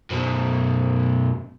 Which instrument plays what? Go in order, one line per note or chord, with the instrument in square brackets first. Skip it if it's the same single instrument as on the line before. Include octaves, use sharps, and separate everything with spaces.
[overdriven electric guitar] F#2 B2